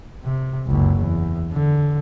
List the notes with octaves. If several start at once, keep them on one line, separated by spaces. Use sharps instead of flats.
C3
F#1 C#2
E2
D3